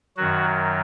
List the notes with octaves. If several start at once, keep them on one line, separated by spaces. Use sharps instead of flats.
F#2 D#3 F#3 F#4